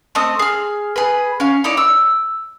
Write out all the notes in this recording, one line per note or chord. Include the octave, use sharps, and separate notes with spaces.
A3 C4 D#5 D#6
G#4 F6
G#4 B4
C#4 F5
D#4 E4 C#5 D5
E6